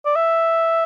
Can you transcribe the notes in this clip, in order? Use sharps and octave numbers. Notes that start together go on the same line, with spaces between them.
D5
E5